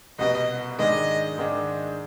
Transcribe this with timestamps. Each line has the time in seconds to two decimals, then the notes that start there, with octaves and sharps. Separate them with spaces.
0.19 C2 B2 B3 D#5
0.79 G#2 D#3 G#3 D4 D#5
1.38 G#2 D#3 G#3 D4